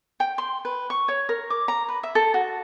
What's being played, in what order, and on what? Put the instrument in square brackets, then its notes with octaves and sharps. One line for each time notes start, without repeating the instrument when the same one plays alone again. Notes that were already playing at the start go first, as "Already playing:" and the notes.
[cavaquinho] G5
C6
B4
C#6
C#5
A#4
D6
A#5
B4
E5
A4
F#4